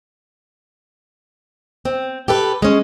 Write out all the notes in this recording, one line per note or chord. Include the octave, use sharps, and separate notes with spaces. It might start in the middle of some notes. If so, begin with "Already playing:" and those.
C4
G4 A4 B4
G#3 C#4